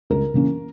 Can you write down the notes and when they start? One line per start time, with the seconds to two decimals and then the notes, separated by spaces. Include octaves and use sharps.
0.10 C#2 A#4
0.34 C#3 E3 A#3 C#4